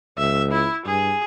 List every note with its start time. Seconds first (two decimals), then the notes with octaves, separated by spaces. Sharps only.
0.18 C#2 E5
0.52 E4
0.86 G2 G#4